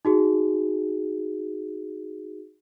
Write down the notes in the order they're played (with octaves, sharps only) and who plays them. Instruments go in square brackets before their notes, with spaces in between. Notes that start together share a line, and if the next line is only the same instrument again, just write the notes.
[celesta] D#4 F#4 G#4